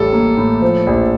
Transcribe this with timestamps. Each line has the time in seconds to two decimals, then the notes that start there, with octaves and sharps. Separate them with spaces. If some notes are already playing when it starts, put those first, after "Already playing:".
Already playing: A1 G3 A4
0.13 A#3
0.37 A2
0.61 F3
0.87 A#1